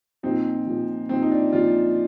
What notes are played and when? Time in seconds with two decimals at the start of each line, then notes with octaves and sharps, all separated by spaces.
0.23 A#2 F3 C4 D#4
0.66 A#2 F3
1.09 A#2 F3 C4 D#4
1.22 D#4
1.31 D4
1.52 A#2 F3 D4 F4